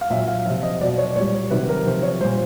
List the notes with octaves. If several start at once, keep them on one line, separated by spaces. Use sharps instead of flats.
F5
A#2 F#3 E5
F5
C3 F3 E5
D#5
B2 F#3 D5
C#5
D5
A#2 G3 C#5
C3 D#3 F#3 B4
A#4
C3 F3 C5
C#5
A#2 G3 C5